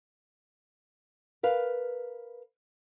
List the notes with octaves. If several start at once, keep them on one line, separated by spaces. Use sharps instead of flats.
A#4 B4 F5